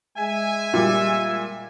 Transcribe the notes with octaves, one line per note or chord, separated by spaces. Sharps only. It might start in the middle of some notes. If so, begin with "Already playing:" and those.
G#3 E5 G#5
A#2 G3